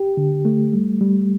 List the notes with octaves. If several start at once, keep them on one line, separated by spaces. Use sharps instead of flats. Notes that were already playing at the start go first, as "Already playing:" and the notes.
Already playing: G4
D3
A3
G3
G3